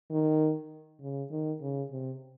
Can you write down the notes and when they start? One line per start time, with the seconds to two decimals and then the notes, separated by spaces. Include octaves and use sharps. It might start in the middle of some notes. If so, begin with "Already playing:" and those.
0.10 D#3
1.01 C#3
1.31 D#3
1.61 C#3
1.92 C3